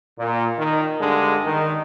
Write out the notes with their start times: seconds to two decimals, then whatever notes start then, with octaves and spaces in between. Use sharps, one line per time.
0.19 A#2
0.58 D#3
1.00 G2 D3 G#3
1.45 D#3